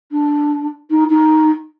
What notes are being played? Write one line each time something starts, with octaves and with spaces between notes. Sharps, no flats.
D4
D#4
D#4